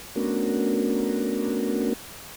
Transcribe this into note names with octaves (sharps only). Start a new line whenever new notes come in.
A3 B3 C#4 D4 F#4 A#4